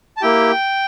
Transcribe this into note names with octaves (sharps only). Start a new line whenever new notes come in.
A5
A#3 E4 G4 G5